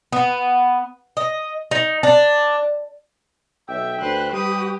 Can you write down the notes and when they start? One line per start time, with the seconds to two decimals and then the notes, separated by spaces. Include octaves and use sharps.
0.12 B3
1.17 D#5
1.71 D#4
2.03 D4
3.69 B1 E5 G5
4.01 D2 B4 C5 F#6
4.33 G3 G4 B4 D#6